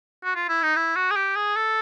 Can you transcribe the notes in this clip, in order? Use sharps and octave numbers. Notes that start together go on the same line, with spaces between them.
F#4
F4
E4
D#4
E4
F#4
G#4
G4
G#4
A4